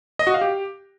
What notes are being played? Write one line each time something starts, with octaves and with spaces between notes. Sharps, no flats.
D#5
F#4
F5
G4